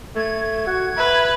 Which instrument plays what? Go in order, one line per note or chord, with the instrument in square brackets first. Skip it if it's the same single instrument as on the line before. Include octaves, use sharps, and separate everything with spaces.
[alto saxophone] A3 [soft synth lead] G#6
[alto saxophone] F#4
[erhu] B4 [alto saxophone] E5